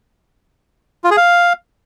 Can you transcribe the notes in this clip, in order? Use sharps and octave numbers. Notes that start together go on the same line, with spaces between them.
F4
G#4
F5